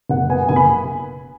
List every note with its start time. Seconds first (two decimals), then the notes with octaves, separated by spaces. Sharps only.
0.09 F#1 F#5
0.29 B3 G#5
0.49 F#1 G#5
0.56 B5